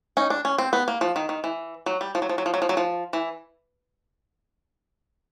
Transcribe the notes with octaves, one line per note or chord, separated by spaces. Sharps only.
C#4 D#4
D4
C#4
C4
B3
A#3
F3
D#3
D#3
E3
F#3
G3
F3
F#3
F3
F#3
F3
F#3
F3
F#3
F3
E3